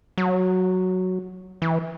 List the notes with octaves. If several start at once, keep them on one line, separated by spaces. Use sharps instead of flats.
F#3
E3